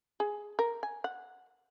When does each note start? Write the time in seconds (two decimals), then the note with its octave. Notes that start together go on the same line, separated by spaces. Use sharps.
0.20 G#4
0.59 A#4
0.83 G#5
1.04 F#5